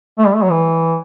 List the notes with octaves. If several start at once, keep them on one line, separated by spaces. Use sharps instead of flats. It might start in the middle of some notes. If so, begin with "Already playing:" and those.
A3
G3
A3
F#3
E3